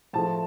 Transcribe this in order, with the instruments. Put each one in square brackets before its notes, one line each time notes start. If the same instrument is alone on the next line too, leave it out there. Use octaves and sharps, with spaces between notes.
[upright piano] A2 F3 A3 A5